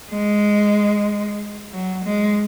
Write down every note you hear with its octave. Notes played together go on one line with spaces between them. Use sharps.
G#3
F#3
G#3